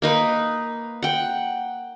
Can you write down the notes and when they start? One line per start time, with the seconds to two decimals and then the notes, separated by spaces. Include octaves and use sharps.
0.02 A#3 D#4 B4
1.03 F#5 G5